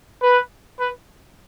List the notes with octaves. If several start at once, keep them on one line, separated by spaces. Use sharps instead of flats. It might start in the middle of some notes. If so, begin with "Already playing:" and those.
B4
B4